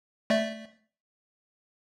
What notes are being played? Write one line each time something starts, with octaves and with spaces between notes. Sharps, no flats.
A3 D5 E5